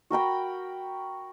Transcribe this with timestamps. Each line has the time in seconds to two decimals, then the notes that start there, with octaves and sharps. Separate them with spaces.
0.10 F#4 A#4 G5 B5